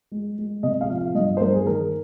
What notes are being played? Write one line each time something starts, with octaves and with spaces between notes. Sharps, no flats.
G#3
G#3
C3 D#5
F5
F3
F5
G2 D#5
C5
G2 A#4
G#4
D#3 A#4